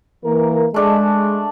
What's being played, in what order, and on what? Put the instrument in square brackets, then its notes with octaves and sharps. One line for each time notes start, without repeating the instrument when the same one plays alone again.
[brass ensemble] E3 A#3 A#4
[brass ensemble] G#3 [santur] A3 D4